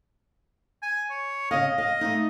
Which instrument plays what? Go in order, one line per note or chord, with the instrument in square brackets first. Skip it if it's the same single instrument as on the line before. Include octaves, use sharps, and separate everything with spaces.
[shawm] G#5
C#5
[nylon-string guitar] C#3 F5 [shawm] D#5
[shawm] D#5 [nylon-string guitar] F5
[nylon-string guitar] A3 D#4